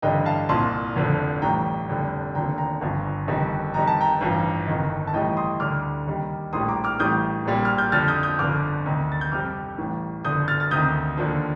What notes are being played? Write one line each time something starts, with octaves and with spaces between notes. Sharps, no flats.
A1 G2 D3 G3 D#5 G5
F5 A5
C2 A#2 F3 A5 C6
F1 F2 D3 F3
A1 A2 G3 G5 A#5
F1 F2 D3 G3
F1 D#2 D3 F3 G5 A#5
G5 A#5
G1 G2 F3
G1 F2 D#3 G3
F2 D#3 G3 A#5
A5
G5 A#5
A1 G2 F3
G1 F2 D#3
A5
A1 A2 G3 D#5 G5
C6 D#6
D2 D3 G3 D6 F6
D#2 D#3 G3
A#1 A2 G3 C6 D#6
A#5 D6
D6 F6
A1 A2 G3 D#6 G6
A#1 A#2 G3
F6
G6
F2 D3 F3 F6 A6
D#6 G6
D#6 G6
G1 F2 D3 D6 F6
D2 C3 D#3
A6
G6
F2 C3 G3 D6 F6
A1 A2 G3
G1 F2 D3 D#6 G6
F6 A6
A6
D2 C3 D#3 D#6 G6
D#2 D3 F3